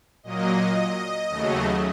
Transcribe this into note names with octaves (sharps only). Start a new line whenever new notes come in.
A#2 F#3 A#3 D#5
D#2 C#3 F#3 A3